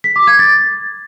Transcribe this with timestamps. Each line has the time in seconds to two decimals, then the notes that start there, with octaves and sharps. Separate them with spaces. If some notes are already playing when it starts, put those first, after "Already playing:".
0.04 B6
0.16 D6
0.27 G#6
0.39 A6